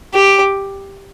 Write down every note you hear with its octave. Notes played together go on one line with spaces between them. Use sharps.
G4